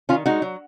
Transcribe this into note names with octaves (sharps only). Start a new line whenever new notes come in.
D#3 C#4 F4
G#3 D#4 F#4
F#3